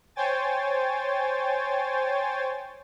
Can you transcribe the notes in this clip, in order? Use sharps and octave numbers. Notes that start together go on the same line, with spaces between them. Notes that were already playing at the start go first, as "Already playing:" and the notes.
C5 C#5 G5 G#5 A6